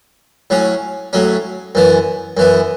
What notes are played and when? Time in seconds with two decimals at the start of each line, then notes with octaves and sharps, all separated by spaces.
0.50 A2 F#3 C#4
1.13 A2 F#3 C#4
1.75 F#2 E3 B3
2.37 F#2 E3 B3